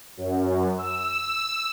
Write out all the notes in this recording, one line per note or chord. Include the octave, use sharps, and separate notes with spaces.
F#2
E6